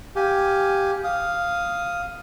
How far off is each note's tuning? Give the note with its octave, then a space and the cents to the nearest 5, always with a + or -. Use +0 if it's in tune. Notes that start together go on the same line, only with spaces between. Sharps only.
G4 +0 F5 +0 G#5 +0
F5 +0 D#6 +0